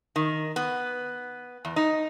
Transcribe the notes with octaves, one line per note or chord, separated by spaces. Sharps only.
D#3
B3
E2
D#4